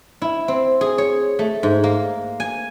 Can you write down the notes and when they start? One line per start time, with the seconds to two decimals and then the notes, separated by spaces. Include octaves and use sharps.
0.22 E4
0.48 C4
0.81 G#4
0.98 C#5
1.39 A3
1.63 G#2
1.84 A#3
2.40 G#5